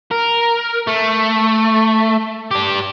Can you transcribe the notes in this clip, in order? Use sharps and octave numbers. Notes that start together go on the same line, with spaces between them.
A#4
A3
D4 G4